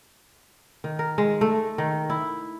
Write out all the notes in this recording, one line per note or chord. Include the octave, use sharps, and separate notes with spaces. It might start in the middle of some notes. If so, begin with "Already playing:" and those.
D#3
A#4
G#3
A3
D#3
E4